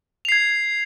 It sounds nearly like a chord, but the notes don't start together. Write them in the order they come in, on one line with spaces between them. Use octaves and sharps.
F7 C7 G#6